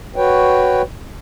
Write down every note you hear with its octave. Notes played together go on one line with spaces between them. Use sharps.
F#4 B4 C#5 G5